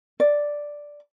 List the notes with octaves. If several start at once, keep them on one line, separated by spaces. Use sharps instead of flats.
D5